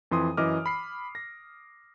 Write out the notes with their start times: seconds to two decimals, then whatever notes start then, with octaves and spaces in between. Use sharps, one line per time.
0.11 F2 E3 C6 D#6
0.37 F#2 E3 D#5 D6 F6
0.66 B5 C7
1.15 A#6